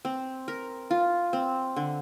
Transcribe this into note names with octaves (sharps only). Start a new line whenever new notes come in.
C4
A#4
F4
C4
D3